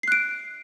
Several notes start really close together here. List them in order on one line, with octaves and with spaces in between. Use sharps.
C7 F#6 D7